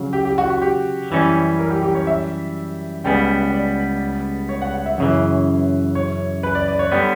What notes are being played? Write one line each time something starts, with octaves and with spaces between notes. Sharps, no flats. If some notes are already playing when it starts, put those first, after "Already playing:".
Already playing: C#3 F#3
G4
G4
F#4
F#4
G4
F#2 E3 G3 C#4
A#4
G4
G4
C#5
E5
C#2 C#3 G3 B3 G5
F#5
G5
F#5
D5
C#5
F#5
F#5
E5
F#2 C#3 E3
C#5
B4
D5
D5
C#5
D3 G3 B3